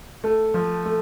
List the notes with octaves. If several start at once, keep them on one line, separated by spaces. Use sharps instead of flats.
A3 A4
F3
A3